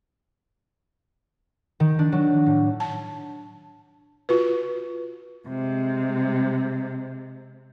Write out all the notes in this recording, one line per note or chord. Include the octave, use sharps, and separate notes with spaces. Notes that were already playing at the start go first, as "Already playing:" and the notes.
D#3
D4
F#3
A2
A5
F4 F#4 B4
C3 G#3